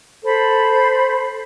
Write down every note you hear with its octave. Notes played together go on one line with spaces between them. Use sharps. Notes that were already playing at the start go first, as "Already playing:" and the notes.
A4 C5 B5